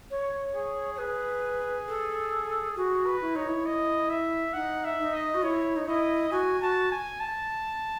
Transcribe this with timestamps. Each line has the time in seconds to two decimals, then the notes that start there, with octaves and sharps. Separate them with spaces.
0.11 C#5
0.55 G#4
0.95 C#5
0.98 G#4 B4
1.88 A4
2.76 F#4 G#4
3.06 B4
3.21 E4
3.35 D#4 C#5
3.48 E4
3.66 D#5
4.10 E5
4.53 D#4 F#5
4.84 E5
4.99 D#4
5.13 D#5
5.35 F#4
5.43 E4 C#5
5.76 D#4
5.87 E4 D#5
6.31 F#4 G#5
6.61 F#4 A5
6.91 G#5
7.20 A5